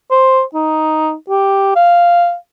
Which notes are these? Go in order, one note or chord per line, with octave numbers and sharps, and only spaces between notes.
C5
D#4
G4
F5